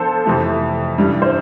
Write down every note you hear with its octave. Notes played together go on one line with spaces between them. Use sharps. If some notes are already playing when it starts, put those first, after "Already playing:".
Already playing: F3 B3 D4 A4 C5
F2 C3 E3 A3
G2 E3 G3
C5